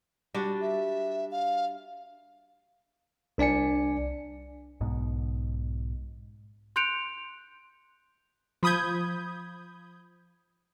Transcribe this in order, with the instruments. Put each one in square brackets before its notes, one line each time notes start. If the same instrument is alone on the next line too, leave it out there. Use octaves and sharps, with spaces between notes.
[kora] G3 D4 F#4
[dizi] E5
F5
[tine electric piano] C2 D4 D5 G#5 C#7
[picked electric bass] B1 G#2 B2
[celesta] C6 F#6 G6 C#7 D7 F7
[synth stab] F3 B5 D#6 G6 G#6